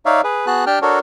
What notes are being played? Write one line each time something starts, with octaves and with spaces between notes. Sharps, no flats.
D#4 C#5 D5 E5 F5
G#4 B4
B3 F#4 G#4 A5 F#6
D4 G4 G5 A5 F6
D4 F#4 A4 A#4 C#5